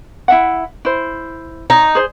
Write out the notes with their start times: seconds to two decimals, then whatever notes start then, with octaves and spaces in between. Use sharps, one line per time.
0.28 E4 E5 F#5
0.85 E4 C5
1.70 D#4 C#5
1.95 G#4 C5